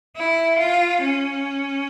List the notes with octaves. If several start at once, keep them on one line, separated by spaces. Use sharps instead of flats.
E4
F4
C#4